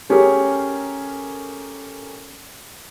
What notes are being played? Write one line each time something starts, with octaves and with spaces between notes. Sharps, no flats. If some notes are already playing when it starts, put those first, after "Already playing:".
A3 C#4 G4 G#4 A#4